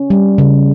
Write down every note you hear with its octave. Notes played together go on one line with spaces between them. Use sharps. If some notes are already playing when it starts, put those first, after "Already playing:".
Already playing: C#4
G3
C#3